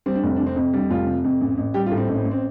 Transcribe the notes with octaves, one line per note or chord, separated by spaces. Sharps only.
G3 C4
D4
F1 C4
C3 D4
C4
F2
G3 D4
F1 F4
C3
F2
A1
A1
G3 G4
F4
A2
C4
A1
C4
A1
C4